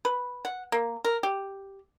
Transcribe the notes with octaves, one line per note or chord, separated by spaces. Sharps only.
B4
F#5
A#3
A#4
G4